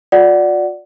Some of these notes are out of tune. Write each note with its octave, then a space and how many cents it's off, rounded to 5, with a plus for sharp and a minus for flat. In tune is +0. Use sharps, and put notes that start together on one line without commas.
F4 +45 D5 +0 F#5 +5